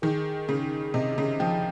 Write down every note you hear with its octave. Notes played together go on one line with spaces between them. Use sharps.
D#3 G#4
C#3 G#4
C3 D#5
C#3
F3 G5